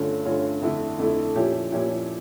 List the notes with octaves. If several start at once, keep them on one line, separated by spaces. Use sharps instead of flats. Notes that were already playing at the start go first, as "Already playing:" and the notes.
Already playing: G2 D3 A3 C#4 F4
G2 D3 A3 C#4 F4
F2 D3 A3 E4
F2 D3 A3 E4
A#2 F3 C#4 E4 G4
A#2 F3 C#4 E4 G4